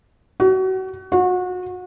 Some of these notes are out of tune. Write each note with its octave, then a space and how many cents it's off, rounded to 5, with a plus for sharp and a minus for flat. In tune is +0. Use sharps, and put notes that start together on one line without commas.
F#4 +30
F#4 -30